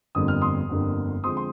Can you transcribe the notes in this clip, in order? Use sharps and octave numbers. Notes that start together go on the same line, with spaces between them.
G1 F2 D3 G3 A#3 D#6
F6
C6 D#6
G1 F2 D3 G3 A#3
D3 F3 G#3 C4 C6 D#6
C6